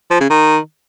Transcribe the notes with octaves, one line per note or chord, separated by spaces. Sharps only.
F3
C#3
D#3